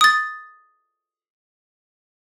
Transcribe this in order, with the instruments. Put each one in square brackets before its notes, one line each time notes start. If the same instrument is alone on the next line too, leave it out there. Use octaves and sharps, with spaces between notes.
[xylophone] D#6 A6